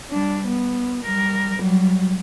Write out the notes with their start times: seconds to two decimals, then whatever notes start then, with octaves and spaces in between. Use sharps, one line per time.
0.10 G3 D4
0.47 B3
1.04 G3 A#4
1.61 F#3 G3